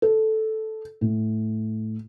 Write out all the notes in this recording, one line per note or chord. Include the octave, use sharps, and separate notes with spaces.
A4
A2